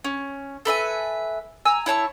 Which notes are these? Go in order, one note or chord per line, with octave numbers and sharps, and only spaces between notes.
C#4
A4 B4 E5 G#5
G#5 A#5 E6
E4 C#5 A5 C#6